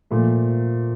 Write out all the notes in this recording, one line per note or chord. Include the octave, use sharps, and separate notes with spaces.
A#2 F3 A3